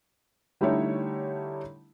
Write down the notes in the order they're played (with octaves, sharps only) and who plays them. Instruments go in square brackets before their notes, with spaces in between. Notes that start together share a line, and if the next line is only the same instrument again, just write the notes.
[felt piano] D3 G3 A3 D#4 E4 C#5